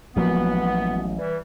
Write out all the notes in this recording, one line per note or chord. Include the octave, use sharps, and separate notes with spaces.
A1 F3 F#3 G#3 A#3 B3 F#4
E3 G3